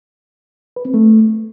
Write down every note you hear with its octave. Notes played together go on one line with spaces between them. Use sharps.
B4
C4
A3